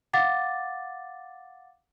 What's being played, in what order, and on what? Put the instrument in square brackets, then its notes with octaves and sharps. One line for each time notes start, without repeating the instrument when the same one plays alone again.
[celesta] F5 F#5 D6 A6